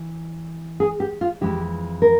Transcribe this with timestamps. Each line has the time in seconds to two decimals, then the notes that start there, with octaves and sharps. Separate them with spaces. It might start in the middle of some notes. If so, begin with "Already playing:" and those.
Already playing: E3
0.80 G#4
1.00 G4
1.21 F4
1.41 F2 E3 G#3 E4 G4
2.02 A#4